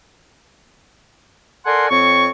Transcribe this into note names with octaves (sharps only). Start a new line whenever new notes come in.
A4 A#4 D5 F#5 G#5 C6
F2 C4 C#5 C#6